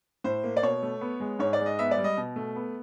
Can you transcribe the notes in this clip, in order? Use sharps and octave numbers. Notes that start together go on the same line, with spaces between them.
A2 C5
A#3
D5
B2 C#5
A3
B3
G#3
G#2 C#5
D5
G#3
D#5
B3 E5
D5
G3
D#5
B2
A3
B3